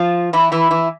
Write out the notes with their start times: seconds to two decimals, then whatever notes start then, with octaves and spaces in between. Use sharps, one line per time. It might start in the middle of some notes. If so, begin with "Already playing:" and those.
Already playing: F3 F4
0.33 E3 E4
0.52 E3 E4
0.71 E3 E4